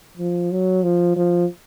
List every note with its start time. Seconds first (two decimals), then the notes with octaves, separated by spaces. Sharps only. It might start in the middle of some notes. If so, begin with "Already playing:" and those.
0.17 F3
0.51 F#3
0.83 F3
1.17 F3